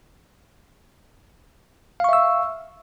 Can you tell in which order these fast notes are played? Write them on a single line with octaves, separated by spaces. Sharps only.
F5 C#6 E5 E6